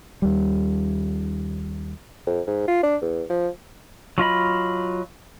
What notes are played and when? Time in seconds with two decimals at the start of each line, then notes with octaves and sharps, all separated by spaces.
0.22 D#2 G3
2.27 F2
2.47 G#2
2.68 F4
2.83 D4
3.02 E2
3.30 F3
4.18 F#3 F4 D#5 B5